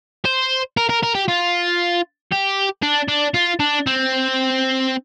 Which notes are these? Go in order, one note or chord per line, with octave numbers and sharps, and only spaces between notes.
C5
A#4
A#4
A#4
G4
F4
G4
D4
D4
F4
D4
C4